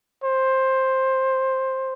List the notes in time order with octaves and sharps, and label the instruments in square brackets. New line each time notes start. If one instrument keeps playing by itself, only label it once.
[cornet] C5